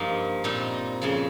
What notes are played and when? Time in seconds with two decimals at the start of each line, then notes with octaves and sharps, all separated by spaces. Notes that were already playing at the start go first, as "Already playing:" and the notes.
Already playing: G2 F3 A#3 D#4
0.44 A#2 G3 C4 D#4
1.02 F2 C#3 F3